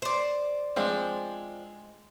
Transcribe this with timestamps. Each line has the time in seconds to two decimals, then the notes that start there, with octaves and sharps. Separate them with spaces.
0.02 C5 D5
0.76 F3 G#3 C4 D4